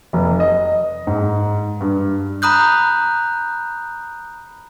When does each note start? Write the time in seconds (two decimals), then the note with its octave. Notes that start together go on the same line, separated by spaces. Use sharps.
0.13 F1
0.40 D#5
1.07 G#2
1.81 G2
2.42 A#5 B5 D#6 F#6 G6